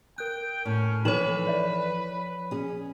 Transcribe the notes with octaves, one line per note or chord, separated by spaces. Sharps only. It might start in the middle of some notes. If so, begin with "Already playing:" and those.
A#4 G5 F#6 G6
A2 C#4
E3 F3 D#4 A4 B4 C#5 E7 F#7
D5 E5
C#4 G#4